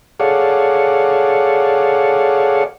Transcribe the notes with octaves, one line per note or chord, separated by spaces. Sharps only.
G#4 A4 C#5 D5 F5 F#5